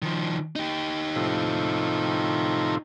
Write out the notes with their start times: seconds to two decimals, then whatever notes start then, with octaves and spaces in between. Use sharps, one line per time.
0.02 D#3 F3
0.56 D#4 G4
1.16 A2 C3 F3